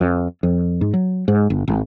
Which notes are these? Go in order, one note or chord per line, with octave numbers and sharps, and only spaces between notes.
F2
F2
G#2
F#3
G#2
G1
G#1